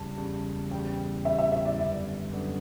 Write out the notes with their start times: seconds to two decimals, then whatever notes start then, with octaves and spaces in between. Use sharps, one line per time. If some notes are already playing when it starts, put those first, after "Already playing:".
Already playing: E2 C#3 G3 A5
0.17 E2 C#3 G3
0.71 E2 C#3 G3 G5
1.25 E2 C#3 G3 E5
1.38 E5
1.52 E5
1.65 D5
1.79 F#2 D3 G3 B3
2.33 F#2 D3 G3 B3